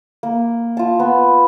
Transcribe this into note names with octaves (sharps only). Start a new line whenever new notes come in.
A#3
F4 A5
B3